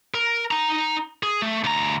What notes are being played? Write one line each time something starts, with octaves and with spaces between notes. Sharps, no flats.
A#4
D#4 A#5
G#4
A3
D2 A#5